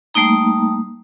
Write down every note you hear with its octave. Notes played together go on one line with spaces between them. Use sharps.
G3 A3 A#3 D#4 A#5